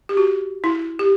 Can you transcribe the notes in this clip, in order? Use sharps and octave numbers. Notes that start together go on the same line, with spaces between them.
G4
F#4
E4
G4